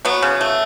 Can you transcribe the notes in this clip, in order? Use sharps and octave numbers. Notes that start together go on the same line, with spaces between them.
F#3 B3
C#3
A3